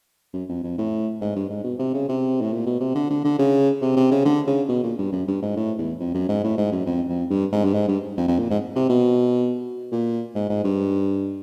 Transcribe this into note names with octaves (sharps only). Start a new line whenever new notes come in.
F#2
F2
F2
A2
G#2
G2
G#2
B2
C3
C#3
C3
A2
A#2
B2
C3
D3
D3
D3
C#3
C3
C3
C#3
D3
C#3
B2
A#2
G2
F#2
G2
G#2
A2
E2
F2
F#2
G#2
A2
G#2
F#2
F2
F2
G2
G#2
G2
G#2
G2
F2
F2
A#2
G#2
C3
B2
A#2
G#2
G#2
G2